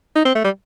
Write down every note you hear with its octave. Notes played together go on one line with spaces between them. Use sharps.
D#4
C4
A3
G3